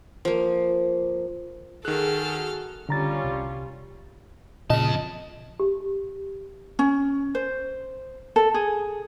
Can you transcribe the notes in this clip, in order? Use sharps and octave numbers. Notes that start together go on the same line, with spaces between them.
F3 A#3
D#3 F#4 G#4 A4 F6 F#6
D3 G3 C#4 F4 A#5 A6
C2
F2 A#2 C#3 D#5 A5
G4
C#4
C5
A4
G#4